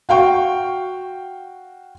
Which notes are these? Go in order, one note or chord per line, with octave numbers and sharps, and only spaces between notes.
F#4 F5 G5 C#6